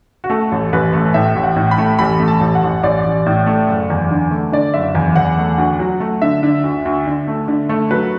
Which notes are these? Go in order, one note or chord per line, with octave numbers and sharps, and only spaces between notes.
F#4
A3 A4
A1
A1 B4
A3
A2 E5
A1
F#5
A2
B5
A3
A1 B5
A3
A5
A1
F#5
A1
A1 D5
A1
A2
A3
F#1
E2
D3
A3
D3 D5
F#1 E5
E2
E2 F#5
A3
D2
F#3
A3
D3 E5
D3
D2
D2
D3
A3
D3
A3
F#3 B4